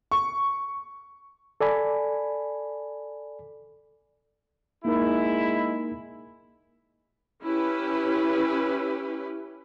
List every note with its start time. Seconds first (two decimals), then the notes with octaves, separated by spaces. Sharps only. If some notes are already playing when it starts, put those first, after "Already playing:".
0.12 C#6
1.61 A4 D5 G#5 B5
4.85 G#3 A#3 D#4 E4 A#4
7.44 C#4 E4 G4 B4